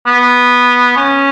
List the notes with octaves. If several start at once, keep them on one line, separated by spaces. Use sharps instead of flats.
B3
C#4